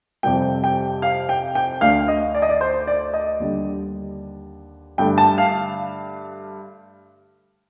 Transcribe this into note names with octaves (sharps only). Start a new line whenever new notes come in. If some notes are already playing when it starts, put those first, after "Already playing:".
F2 C3 G3 G5
G5
F5
G5
G5
D2 D3 A3 F5
D#5
D5
D#5
D5
C5
D5
D#5
D#2 D3 G3
G2 D3 A3 G5
A5
F5